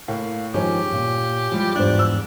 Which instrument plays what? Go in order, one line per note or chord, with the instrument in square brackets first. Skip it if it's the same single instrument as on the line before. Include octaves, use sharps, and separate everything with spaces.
[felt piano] A2 [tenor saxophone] A#3
[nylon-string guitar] D#3 F3 G#3 [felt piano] C#4 [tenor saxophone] G4
[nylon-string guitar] A#2
[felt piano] F3 G3 [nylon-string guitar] G#3 E4
[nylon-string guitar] E2 G#2 C5 [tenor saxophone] D4
[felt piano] E6